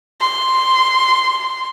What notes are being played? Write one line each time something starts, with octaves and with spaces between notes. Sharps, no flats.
C6